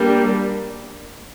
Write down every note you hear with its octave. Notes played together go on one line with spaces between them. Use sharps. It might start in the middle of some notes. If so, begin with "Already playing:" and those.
Already playing: G3 A#3 D4